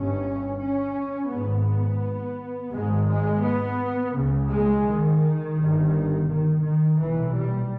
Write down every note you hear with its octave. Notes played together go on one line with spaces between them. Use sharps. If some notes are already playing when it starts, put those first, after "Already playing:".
Already playing: G1 G2 C#4
C#4
G#1 G#2 B3
G#1 G#2 G#3
G#3
B3
C#2 C#3
G#3
D#3
G1 G2
D#3
D#3
B1 A#2 E3
G3